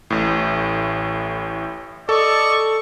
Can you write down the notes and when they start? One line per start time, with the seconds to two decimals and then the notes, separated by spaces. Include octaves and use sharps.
0.10 A1 A2
2.09 A4 D5 D#5 C#6